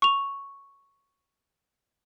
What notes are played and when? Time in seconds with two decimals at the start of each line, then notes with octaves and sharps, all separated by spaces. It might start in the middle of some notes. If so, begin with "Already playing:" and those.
0.02 C#6 F7